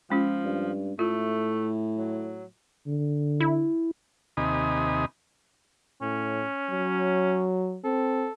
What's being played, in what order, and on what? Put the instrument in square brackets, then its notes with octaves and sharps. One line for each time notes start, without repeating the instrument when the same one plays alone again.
[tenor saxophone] F3 [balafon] G#3 C#4 F4
[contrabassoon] G2
[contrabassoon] A2 [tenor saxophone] A3 [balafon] F4
[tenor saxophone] F#3
[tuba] D3
[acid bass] E4
[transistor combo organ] D#2 C3 D#4 G#5 B5 D#6
[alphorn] A2 [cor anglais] C#4
[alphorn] F#3
[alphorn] C4 [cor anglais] A4